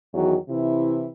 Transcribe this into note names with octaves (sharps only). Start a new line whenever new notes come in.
E2 D#3 F#3 F#4
C3 E3 E4